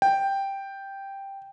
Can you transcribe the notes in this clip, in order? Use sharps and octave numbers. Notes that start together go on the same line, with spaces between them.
G5